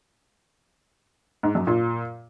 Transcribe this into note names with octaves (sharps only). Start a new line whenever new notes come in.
G#2
F#2
A#2